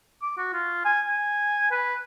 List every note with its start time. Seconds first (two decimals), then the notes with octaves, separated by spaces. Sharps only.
0.22 D6
0.37 F#4
0.53 F4
0.85 G#5
1.08 G#5
1.71 B4